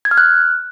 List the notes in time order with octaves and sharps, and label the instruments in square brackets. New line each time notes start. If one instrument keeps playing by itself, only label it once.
[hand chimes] G#6
F6
F#6